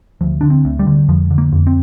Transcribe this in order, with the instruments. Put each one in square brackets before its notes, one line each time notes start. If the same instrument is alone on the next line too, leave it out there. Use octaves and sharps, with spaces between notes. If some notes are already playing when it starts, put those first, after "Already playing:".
[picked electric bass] D2 F3
D3 D4
C4
D2
G3
D3
F2 F3
D3
A#3
F2
C4